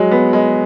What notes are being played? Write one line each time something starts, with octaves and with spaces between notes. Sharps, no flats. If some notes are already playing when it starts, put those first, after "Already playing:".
Already playing: F#3 G#3
B3
G#3